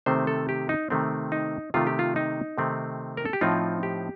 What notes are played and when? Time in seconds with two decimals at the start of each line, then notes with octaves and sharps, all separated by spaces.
0.06 C3 D#3 A3 C4 C5
0.27 A4
0.49 G4
0.69 D#4
0.90 C3 D#3 A3 C4
1.32 D#4
1.74 C3 D#3 A3 C4 F4
1.87 G4
1.99 F4
2.16 D#4
2.58 C3 D#3 A3 C4
3.17 A#4
3.25 A4
3.33 G4
3.41 A2 F3 C4 D#4 F4
3.83 G4